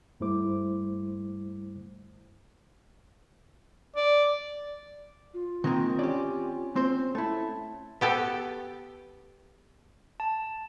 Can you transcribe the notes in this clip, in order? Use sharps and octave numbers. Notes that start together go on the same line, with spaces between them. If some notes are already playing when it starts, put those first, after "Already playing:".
G2 G3 A3 E4 C5 D6
D5
F4
D#3 G#3 A#3 C4
C#4 G4 D5
C4 C5
A3 E4 A5
B3 G4 A4
A5